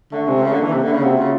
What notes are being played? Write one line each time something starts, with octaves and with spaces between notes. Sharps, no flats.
D3 A3
C3 G#3
C#3 A3
D3 A#3
E3 D4
C3 D#4
D3
E4
C#3
C3 F#4
C#3 F4